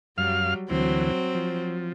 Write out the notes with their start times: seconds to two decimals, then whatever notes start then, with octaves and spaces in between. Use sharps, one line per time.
0.18 F#2 F#3 G3 F5 F6
0.70 D2 E3 F#3 C4
1.35 F3